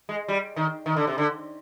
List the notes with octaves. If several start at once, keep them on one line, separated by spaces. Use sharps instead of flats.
G#3
G3
D#3
D#3
D3
C3
D3